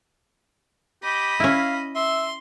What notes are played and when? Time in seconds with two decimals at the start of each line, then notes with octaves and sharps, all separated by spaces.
1.03 G4 D#5 B5
1.40 C#4 E4 F5
1.95 E5 C6